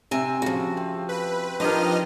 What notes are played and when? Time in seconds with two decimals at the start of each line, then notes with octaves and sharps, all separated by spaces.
0.11 C3 C4 E5 G#5
0.42 C#3 F3 F#4
0.77 C4
1.09 B4
1.60 D#3 F3 G3 D4 B4 D#5 F6